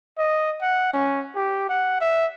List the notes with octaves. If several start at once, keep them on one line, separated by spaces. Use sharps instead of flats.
D#5
F#5
C#4
G4
F#5
E5